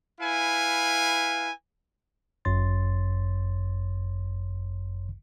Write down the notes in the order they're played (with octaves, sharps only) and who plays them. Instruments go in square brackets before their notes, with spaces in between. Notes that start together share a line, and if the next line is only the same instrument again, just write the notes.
[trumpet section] E4 B4 F5 G#5
[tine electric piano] G1 F#2 C#5 C6 A6